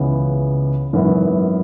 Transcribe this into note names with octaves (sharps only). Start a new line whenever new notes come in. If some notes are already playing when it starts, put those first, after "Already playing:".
Already playing: C#2 C#3 E3 B3
G#1 F#2 E3 B3